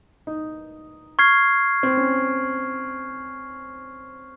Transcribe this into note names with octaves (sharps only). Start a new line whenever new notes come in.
D#4
C#6 F6 G#6 C7
C4
C#4